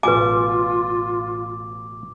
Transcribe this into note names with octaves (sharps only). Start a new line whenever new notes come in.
A1 B2 F#3 F4 B4 G#5 D6